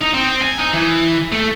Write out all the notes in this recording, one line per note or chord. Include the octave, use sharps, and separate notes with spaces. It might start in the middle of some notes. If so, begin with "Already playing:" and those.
D#4
C4
G#5
D#4
E3
A3